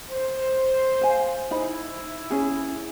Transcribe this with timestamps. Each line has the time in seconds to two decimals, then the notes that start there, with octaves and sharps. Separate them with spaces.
0.11 C5
1.01 F5 G#5
1.51 D#4 E4 C5 B5
2.30 C#4 G#4